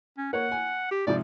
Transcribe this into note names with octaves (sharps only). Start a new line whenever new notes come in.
C#4
A#3 C#5 F#5
G#5
G4
G#2 C3 F3 D5